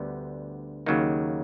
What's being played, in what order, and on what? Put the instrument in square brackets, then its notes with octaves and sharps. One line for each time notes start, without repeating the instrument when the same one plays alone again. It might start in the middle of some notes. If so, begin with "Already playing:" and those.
Already playing: [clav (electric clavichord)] D2 D3 G3 B3
D#2 C#3 F#3 A#3 D#4